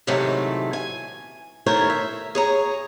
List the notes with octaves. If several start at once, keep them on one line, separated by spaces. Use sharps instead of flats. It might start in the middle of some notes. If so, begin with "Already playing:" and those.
G#2 C3 D#3 E3 F#3 A3
G#5
D#3 A3 E4 A#4 C5 C#5
E5
G#4 C#5 A#5